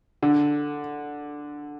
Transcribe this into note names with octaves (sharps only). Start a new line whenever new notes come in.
D3